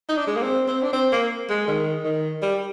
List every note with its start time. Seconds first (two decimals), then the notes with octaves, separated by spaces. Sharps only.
0.09 D#4
0.18 D4
0.28 G#3
0.36 A#3
0.43 C4
0.68 C4
0.83 D4
0.93 C4
1.12 A#3
1.50 G#3
1.68 D#3
2.05 D#3
2.42 G3